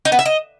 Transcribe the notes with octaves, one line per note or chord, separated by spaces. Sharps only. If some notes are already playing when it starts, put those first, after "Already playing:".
D#4
B3
E5
D#5